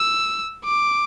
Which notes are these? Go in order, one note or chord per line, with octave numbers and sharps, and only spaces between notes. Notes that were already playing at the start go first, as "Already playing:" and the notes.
Already playing: E6
D6